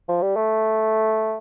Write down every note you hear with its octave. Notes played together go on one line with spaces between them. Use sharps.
F3
G3
A3